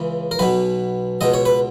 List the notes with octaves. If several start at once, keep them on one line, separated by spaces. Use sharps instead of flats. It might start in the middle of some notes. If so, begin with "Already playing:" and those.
Already playing: C#2 C#3 E3
A#4
B1 B2 B4
C#2 B2 D#5
C#5
B4